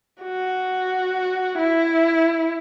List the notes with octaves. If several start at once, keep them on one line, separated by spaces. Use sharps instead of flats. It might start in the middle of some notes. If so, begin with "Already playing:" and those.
F#4
E4